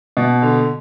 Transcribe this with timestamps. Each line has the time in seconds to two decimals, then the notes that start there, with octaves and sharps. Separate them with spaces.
0.17 B2
0.42 D3